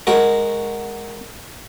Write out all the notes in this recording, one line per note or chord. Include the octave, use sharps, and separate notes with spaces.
G#3 F#4 A#4